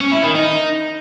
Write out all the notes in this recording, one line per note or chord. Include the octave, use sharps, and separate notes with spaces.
C#4
E4
D#3
D#4